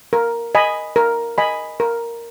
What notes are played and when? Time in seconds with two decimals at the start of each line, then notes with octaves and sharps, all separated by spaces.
0.13 A#4
0.55 D#5 G#5 B5
0.96 A#4
1.38 D#5 G#5 B5
1.80 A#4